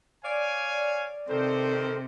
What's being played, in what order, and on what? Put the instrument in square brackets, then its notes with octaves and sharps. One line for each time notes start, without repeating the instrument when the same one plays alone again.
[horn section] C#5 F5 G#5 [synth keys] D5
[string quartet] C3 [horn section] D#3 A#4 C5 [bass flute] A4